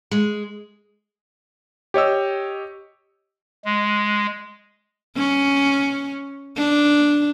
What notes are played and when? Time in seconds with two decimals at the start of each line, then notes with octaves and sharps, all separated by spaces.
0.11 G#3
1.94 G4 C#5 D#5 E6
3.65 G#3
5.17 C#4
6.57 D4